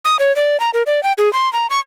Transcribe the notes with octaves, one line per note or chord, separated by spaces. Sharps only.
D#6
C#5
D5
A#5
A#4
D5
G5
G#4
C6
A#5
C#6